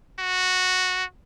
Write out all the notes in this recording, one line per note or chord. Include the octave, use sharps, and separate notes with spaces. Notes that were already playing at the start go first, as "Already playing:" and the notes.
F#4